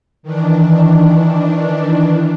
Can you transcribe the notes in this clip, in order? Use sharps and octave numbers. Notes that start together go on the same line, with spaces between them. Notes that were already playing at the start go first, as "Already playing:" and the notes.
D#3 E3 D4